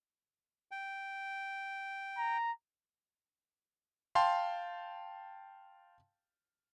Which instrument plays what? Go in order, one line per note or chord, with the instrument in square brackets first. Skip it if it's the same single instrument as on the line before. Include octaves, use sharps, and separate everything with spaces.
[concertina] G5
[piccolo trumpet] A#5
[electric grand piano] F5 G5 A5 C6